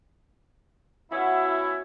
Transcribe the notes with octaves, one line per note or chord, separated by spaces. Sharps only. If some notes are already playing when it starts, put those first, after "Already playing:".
B2 C#4 E4 F#4 D#5